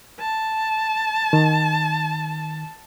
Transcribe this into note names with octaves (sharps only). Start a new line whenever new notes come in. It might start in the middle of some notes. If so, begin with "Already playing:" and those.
A5
D#3